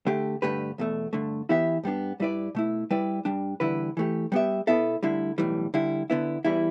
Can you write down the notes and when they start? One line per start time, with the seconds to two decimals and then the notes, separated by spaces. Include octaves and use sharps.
0.06 D3 A3 G4
0.42 G2 D3 A3 G4 B4
0.78 E2 B2 A3
1.13 G2 D3 A3
1.49 E3 B3 E4 G4 E5
1.83 G2 G3 B3 D4
2.20 G2 G3 E4 B4 D5
2.55 B2 A3 E4
2.91 G3 E4 B4 D5
3.25 G2 G3 D4
3.60 E2 D3 G3 E4 B4
3.97 E3 A3 G4
4.32 G3 B3 G4 E5
4.67 B2 B3 E4 A4 E5
5.03 D2 D3 G3 E4
5.38 B1 A2 E3 G3
5.74 D3 G3 E4
6.10 D3 B3 E4
6.45 E2 E3 G3 E4